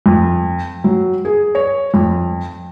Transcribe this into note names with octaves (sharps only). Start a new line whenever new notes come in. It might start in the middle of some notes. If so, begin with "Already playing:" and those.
F2
F#3
G#4
C#5
F2